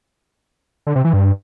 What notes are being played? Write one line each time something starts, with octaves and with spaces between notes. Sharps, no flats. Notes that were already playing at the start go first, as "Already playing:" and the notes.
D3
C3
E3
G2